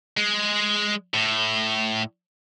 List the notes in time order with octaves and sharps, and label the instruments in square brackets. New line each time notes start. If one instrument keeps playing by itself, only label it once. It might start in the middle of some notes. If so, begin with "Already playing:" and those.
[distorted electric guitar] G#3
A2